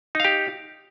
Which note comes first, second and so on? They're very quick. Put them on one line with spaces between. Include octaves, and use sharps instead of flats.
D#4 F5 G4